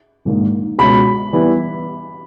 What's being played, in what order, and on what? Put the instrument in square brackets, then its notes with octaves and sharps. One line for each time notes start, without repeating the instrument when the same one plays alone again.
[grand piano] A#1 G#2 D#3 A#3
[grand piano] C#2 B2 G#3 C#4 [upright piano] B5
[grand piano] E3 G3 B3 E4